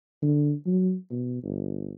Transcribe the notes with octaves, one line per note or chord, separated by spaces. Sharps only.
D3
F#3
B2
G1